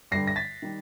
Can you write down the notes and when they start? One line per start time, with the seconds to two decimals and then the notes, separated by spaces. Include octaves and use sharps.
0.11 G2 D3 G3 A#6 C7
0.27 A#6
0.36 A6 B6
0.62 D#3 G3